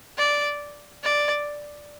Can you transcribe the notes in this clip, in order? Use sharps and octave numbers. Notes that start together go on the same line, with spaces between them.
D5
D5